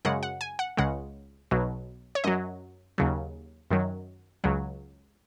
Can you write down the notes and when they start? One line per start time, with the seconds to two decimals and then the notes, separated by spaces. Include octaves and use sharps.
0.05 F#2 C#3 G#3 F#5
0.23 F#5
0.41 G#5
0.59 F#5
0.77 C#2 C#3 G#3 F#5
1.51 B1 B2 F#3
2.15 C#5
2.24 F#2 F#3 D#5
2.98 D#2 C#3 F#3
3.70 F#2 D#3 F#3
4.44 C#2 C#3 F#3